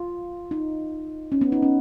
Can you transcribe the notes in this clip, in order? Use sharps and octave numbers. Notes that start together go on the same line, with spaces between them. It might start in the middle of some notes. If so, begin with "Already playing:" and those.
Already playing: F4
D#4
C#4
B3
D#4
C#4